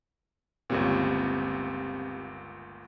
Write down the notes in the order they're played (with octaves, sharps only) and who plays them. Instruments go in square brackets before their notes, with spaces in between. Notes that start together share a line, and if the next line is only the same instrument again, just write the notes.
[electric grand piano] G1 C#2 A#2 [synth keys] C4 G4